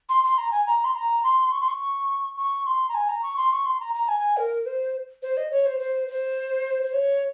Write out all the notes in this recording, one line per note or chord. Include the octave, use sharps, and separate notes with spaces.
C6
C6
A#5
G#5
A#5
C6
A#5
C6
C#6
C6
C#6
C#6
C6
A#5
G#5
A#5
C#6
C6
C#6
C6
A#5
A#5
G#5
A#4
C5
C5
D#5
C#5
C5
C5
C5
C5
C#5